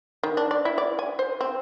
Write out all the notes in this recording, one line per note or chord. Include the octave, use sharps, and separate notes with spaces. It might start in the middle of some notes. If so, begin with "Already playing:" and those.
D#3
D4
D5
E4
D5
G#5
C5
C4